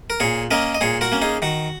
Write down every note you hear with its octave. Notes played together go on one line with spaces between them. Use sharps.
A#4
A#2 G#4 C#5
A#3 C#4 A#4 D#5
D#5
A#2 G#4 C#5
F#4 A#4
A#3 C#4
D#4 G#4
D#3 F#4